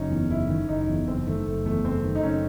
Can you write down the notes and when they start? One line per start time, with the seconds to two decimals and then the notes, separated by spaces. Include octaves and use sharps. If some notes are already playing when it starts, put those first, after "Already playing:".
Already playing: F#1 C#4 D#4
0.10 E2
0.30 F#1 E4
0.50 D#3
0.69 F#1 D#4
0.88 E2
1.08 F#1 C4
1.27 D#3 A3
1.46 F#1 A3
1.65 E2 A3
1.85 F#1 C4
2.04 D#3
2.15 D#4
2.23 F#1 C#4